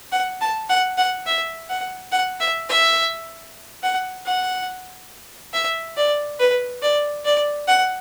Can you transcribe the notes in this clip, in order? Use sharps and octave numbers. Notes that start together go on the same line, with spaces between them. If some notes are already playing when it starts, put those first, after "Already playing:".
F#5
A5
F#5
F#5
E5
F#5
F#5
E5
E5
F#5
F#5
E5
D5
B4
D5
D5
F#5